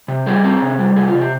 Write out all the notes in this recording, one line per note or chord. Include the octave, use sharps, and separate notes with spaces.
C3
G3 G#4
C4
C3
G3
C3 G#4
F4
C3
G4